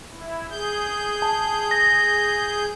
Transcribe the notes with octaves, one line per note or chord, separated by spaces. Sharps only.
E4
G#4 G6
A5
A#6